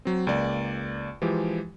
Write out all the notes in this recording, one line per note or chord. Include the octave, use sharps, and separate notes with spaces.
F#3 C4
C#2 A#3 D5
E3 F3 G#3 G4